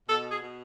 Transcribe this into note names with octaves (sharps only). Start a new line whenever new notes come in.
B2 A4
G#4
B2